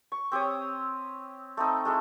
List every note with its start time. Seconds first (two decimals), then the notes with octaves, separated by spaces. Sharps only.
0.12 C#6
0.32 C4 G4 C#5 D#6
1.57 A3 C4 D#4
1.85 G#3 A3 E4